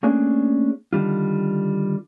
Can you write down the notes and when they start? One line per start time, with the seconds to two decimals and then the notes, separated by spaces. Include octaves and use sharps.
0.03 A3 A#3 C#4 D4 G#4 G#5
0.93 D3 D#3 G3 F4